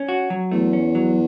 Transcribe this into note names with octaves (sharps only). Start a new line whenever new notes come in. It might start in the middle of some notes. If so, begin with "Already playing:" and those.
Already playing: C#4
F#4
F#3
E2 A3
C#4
F#3